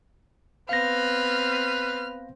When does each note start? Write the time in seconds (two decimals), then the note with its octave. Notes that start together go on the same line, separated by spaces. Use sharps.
0.69 B3 C4 B4 F5 F6 A#6